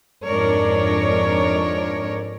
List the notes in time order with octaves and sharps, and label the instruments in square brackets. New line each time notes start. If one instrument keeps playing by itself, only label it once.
[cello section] F2 G#2 D4 A#4 C#5 D5